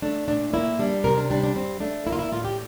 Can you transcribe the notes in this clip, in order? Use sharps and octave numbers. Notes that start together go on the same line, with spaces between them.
A3 D4
A#2 D4
A#3 E4
G3 D4
C3 A#4
D4
G3 D4
D4
G2 C4
A3 D4
A#3 E4
F4
E4
A2 F4
G4